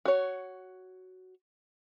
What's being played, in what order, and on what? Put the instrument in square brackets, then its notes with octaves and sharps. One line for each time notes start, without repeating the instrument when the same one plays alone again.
[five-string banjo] F#4 C#5